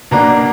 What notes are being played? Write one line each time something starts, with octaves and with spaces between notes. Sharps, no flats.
B2 A#3 D4 A#5